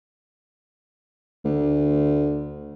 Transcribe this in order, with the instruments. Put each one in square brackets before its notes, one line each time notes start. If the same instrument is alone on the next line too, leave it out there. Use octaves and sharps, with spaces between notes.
[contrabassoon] D2